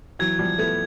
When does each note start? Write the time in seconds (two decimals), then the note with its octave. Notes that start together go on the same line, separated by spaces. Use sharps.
0.19 E3 F#3 G#6
0.39 F3 G3
0.59 A3 B3 G#6